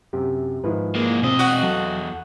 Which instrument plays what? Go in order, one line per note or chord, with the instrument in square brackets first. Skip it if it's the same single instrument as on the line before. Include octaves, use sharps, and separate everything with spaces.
[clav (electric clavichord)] F#2 C3 [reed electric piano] G4
[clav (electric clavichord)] G#2 D#3 F3 [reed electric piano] E4 B4
[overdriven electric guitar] A#3 G#4
[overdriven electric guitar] E2 D#5 [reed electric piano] B2 C4
[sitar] F#4 [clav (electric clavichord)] D5
[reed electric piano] F#3 [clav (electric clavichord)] A4